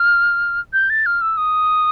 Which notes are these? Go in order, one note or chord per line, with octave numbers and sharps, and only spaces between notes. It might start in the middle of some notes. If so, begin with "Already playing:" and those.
Already playing: F6
G6
A6
F6
E6
D#6